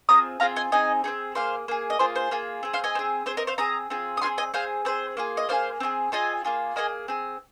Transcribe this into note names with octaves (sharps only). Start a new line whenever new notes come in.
C4 F4 G#4 A#5 D#6
C4 F4 G#4 F5 A#5
D#5 G#5
C4 D#4 G#4 D#5 G#5
C4 D#4 G#4
A#3 G#4 C5 F5
A#3 G#4
D#5
A#3 F4 G#4 C5
C5
A#3 F4 G#4
C4 G#4
C5 F5
D#5 G#5
C4 G#4
C4 G#4 C5
A#4 D#5
C5 F5
C4 G#4 A#5 D#6
C4 F4 G#4
D#6
C4 F4 G#4 G#5 C6
D#5 G#5
C4 G#4 C5 F5
C4 G#4 C5
A#3 F4 G#4
D#5
A#3 F4 G#4 C5 F5
C4 F4 G#4
C4 F4 G#4 D#5 G#5
A#3 F4 G#4
A#3 F4 G#4 D#5 G#5
C4 G#4